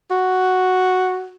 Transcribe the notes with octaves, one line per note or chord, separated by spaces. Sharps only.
F#4